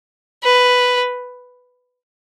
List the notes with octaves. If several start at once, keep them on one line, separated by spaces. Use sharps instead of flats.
B4